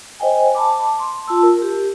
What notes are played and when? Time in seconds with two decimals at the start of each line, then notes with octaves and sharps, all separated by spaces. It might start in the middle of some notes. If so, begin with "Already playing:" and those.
0.20 C5 D#5 G5 G#5
0.55 A5 B5 D6
0.99 C6
1.28 F4 A5 E6
1.43 A#4
1.62 G4